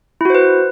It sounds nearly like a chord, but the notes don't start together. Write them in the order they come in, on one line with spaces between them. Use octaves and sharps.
E4 F#4 C5 B4